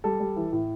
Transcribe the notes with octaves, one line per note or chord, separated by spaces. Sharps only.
G3 A4
G3
E3
A2